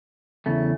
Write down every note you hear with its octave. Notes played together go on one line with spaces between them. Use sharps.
E2 C#3 A3